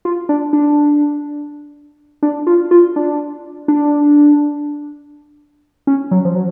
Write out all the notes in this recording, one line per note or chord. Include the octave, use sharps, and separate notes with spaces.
F4
D4
D4
D4
F4
F4
D4
D4
C#4
F#3
F3
F#3